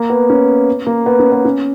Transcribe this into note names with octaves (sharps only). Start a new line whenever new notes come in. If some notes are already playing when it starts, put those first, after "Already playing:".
Already playing: A#3
B3
C#4
A#3
B3
C#4
B3
C#4